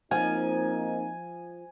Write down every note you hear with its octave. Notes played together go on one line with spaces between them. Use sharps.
F3 A#3 C4 D#4 G#5